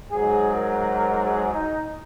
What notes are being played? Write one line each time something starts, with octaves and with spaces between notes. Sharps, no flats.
G#2 F#3 G#4
A#4
A#4
G#4
D#4